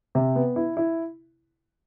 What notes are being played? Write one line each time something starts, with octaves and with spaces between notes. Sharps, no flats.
C3
B3
E4
E4